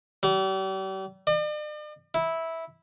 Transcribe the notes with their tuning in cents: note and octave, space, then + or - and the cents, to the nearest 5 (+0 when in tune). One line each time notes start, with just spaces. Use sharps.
G3 -40
D5 +45
E4 -10